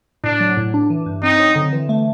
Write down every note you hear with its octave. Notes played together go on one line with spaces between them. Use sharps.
A2 D4
F#3
A2
D4
E3
G2
C4 D#4
F#3
D3
E3
A3